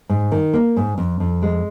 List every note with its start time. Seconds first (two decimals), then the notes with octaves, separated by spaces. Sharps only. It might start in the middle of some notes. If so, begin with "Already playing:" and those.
0.09 G#2
0.32 D#3
0.53 A#3
0.76 G#2
0.98 F2
1.20 F2
1.42 G#3